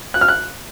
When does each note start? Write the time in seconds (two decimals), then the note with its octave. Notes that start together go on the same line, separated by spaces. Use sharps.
0.14 F#6
0.21 F6
0.28 F#6